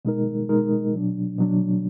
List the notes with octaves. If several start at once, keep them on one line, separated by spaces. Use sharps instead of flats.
B2 G#3 D#4 A#4
B2 G#3 D#4 A#4
B2 F#3 D4
B2 F#3 D4